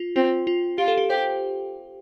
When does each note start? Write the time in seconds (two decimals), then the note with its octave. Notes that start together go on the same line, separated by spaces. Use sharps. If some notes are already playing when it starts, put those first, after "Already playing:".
Already playing: F4
0.16 C4 F4
0.47 F4
0.78 F4 G4
0.88 A4
0.97 G4
1.10 G4 C5